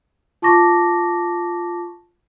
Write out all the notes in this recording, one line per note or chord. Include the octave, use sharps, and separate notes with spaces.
F4 A5 C#6 D6 A#6